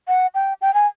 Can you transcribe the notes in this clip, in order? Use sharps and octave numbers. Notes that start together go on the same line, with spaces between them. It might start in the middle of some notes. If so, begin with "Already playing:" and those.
F#5
G5
G5
G#5